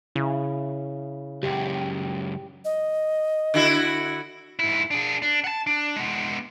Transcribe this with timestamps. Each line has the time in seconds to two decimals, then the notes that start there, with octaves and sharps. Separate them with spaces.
0.15 C#3 E4
1.43 C#2 F#2 G4
2.65 D#5
3.54 D3 E4 F#4
4.59 G#2 E4
4.91 D4 G#4
5.22 D4
5.44 F#5 A5
5.67 D4
5.96 G#3 B3